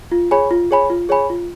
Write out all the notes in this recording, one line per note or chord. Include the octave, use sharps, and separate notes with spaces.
F4
G#4 C#5 G#5 B5
F4
G#4 C#5 G#5 B5
F4
G#4 C#5 G#5 B5
F4